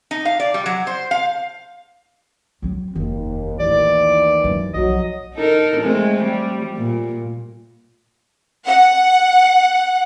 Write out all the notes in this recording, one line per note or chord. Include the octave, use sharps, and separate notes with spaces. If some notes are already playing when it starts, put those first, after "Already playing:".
D#4
F5
D5
G3
F#3
C5
F5
F#3 C4
F1 D#2 D#3
A#1 D#2 E3 A3 D5
F#2
B1 F2 F#3 D#5
D#4 A4 A#4
G#3 A3 C4
G3
A#2
F#5